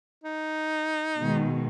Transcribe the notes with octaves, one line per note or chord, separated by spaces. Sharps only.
D#4
B2 D#3 G#3